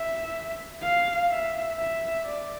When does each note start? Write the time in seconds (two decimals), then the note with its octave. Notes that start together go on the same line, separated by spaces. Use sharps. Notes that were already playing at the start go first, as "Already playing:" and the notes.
Already playing: E5
0.82 F5
1.30 E5
1.78 E5
2.26 D5